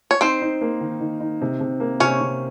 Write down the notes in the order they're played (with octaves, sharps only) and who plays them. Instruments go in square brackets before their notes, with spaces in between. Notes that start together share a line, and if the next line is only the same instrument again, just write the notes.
[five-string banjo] C#5
[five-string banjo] C4 C5 [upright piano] D#4
[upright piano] D#4
A#3
D#3
D#3
D#4
C3
C3
A#3
[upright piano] C3 [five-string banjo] C#4 C#5
[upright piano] C3